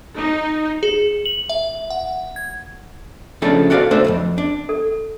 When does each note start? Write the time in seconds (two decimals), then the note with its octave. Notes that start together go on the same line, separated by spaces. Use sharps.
0.17 D#4
0.83 G#4
1.26 F#7
1.50 E5
1.90 F#5
2.36 G#6
3.42 C#3 F3 A3 D4 A4
3.70 F#4 A4 D5 D#5 F5
3.91 A3 D4 A4 C5
4.04 B1 F2
4.38 D4
4.69 A4